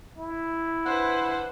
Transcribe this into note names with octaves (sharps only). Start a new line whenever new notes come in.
E4
D4 B4 C5 F#5